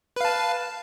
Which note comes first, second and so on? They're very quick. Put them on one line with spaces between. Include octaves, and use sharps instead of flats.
B4 F5 A5